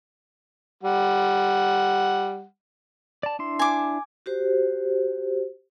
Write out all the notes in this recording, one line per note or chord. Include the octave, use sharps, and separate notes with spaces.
G3 F#5
D5 A5
D4 E4 C6
G#5 D6
F#4 G4 C5